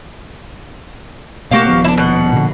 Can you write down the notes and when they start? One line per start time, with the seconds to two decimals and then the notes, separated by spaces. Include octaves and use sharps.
1.51 B2 A3 A#3 F#4 G4 F5
1.67 D#1 F3 B3
1.85 D4 E4
1.98 B2 F#5
2.33 A#2 D3 F3